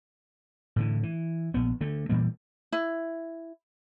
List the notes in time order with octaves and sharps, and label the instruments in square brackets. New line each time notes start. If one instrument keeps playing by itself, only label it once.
[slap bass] A2 D3 E3
E3
A#1 B3
D3 A3
A#2 E3 G3 A#3
[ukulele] E4